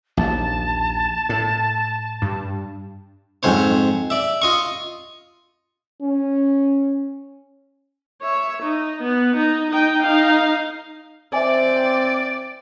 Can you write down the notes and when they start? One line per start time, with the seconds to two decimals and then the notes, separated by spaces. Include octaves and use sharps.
0.17 A#1 D#2 A5
1.29 A2
2.22 G2
3.43 F2 G#2 C5 C#5
4.10 D5 E5
4.42 F4 D#5 C#6
6.02 C#4
8.22 C#5 E5
8.63 D#4
9.02 B3
9.37 D#4
9.71 D#4 G5
10.03 D#4 F5
11.33 C4 C5 D5 E5 G#5